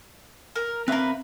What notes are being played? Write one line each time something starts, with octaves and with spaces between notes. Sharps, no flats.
A#4
C4 A#4 B4 E5 F5